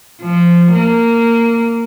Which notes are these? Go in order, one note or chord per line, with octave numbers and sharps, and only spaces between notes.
F3
A#3